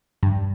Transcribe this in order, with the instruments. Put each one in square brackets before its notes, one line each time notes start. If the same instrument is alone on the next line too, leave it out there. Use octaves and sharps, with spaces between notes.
[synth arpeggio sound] G2